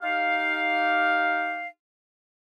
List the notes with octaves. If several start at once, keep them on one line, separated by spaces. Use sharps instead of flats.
D#4 G4 F5